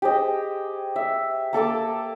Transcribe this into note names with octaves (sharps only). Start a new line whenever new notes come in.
G4 G#4 C5 D#5
E5
A#3 A4 A5 D6